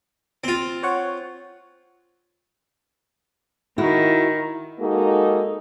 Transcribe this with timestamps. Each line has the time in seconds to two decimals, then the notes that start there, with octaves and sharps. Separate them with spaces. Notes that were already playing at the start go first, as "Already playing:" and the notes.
0.44 C4 F4
0.83 C5 C#5 F#5
3.78 D#3 E4 F#4
4.79 G#3 A#3 D#4 F#4 A4